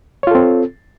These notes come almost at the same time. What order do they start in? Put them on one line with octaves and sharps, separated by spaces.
C#5 F4 A4 C4